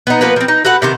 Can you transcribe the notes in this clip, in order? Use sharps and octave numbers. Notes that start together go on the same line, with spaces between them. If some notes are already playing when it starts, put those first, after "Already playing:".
B3 D#4
F3 A#3 B3 B4
F3 C4
D#4
F#4 A4 B4 F#5
C3 D#3 C5